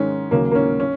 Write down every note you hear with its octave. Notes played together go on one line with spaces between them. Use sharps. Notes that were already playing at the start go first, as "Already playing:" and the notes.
Already playing: G#2 D#3 G#3 C#4
D#2 C#3 F#3 A#3
A#3
C#4
C#4